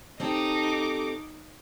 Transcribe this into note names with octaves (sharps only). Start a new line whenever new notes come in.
C4 D#4 G4 A4 D6